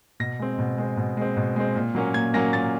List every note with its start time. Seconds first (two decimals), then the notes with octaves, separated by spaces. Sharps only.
0.20 B2 A#6
0.40 G#3 C4
0.59 B2
0.78 G#3 C4
0.97 B2
1.17 G#3 C4
1.37 B2
1.56 G#3 C4
1.75 A#2
1.95 F#3 A#3 C#4
2.14 A#2 G#6
2.34 F#3 A#3 C#4 A#6
2.53 A#2 A6